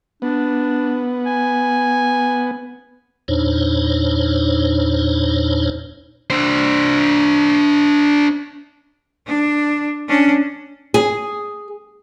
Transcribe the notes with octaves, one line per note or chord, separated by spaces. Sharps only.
B3 D4
G#5
E2 A#2 D4 D#4 C5 C#5
D4 C5
D4
C#4 D4
G#4